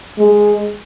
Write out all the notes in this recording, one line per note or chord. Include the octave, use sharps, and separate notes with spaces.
G#3